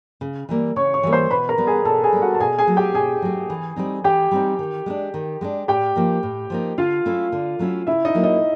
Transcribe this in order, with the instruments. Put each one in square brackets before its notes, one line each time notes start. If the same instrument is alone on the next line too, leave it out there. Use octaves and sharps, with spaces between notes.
[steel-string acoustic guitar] C#3
E3 G3 A#3
[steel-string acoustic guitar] C#3 [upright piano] C#5 C#6
[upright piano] C#5 C#6
[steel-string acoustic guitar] E3 G3 A#3
[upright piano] C5 C6
[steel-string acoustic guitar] B2 [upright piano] B4 B5
[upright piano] A#4 A#5
[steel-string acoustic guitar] G3 B3
[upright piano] G#4 G#5
[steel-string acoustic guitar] B2 [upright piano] A4 A5
[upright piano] G#4 G#5
[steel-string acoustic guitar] G3 B3
[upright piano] F#4 F#5
A5
[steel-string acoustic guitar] B2 [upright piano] G#4 G#5
[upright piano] G#4 G#5
[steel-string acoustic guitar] F#3 A3
[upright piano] G4 G5
[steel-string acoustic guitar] B2 [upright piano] G#4 G#5
[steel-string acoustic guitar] F#3 A3
E3
G3 C4 D#4
[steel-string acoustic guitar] E3 [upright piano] G4 G5
[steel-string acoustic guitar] G3 C4 D#4
D#3
G#3 B3 D4
D#3
G#3 B3 D4
[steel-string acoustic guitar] A2 [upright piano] G4 G5
[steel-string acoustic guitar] F3 A#3 D#4
A2
F3 A#3 D#4
[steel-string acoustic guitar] D3 [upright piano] F4 F5
[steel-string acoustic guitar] F#3 A3 C#4 E4
D3
F#3 A3 C#4 E4
[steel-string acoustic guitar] C#3 [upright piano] E4 E5
[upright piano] D#4 D#5
[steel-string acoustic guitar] F#3 A#3 C#4 E4
[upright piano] D#4 D#5